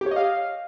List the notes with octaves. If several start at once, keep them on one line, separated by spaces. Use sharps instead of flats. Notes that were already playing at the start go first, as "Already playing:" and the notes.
G4
C#5
D#5
F5